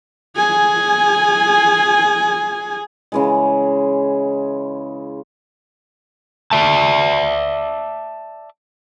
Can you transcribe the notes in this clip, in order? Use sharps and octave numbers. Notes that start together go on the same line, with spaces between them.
G#4 G#5
C#3 E3 G#3
D5 E5 A5